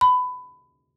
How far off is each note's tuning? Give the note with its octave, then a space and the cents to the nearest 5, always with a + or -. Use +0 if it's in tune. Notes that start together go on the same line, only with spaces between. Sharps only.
B5 +20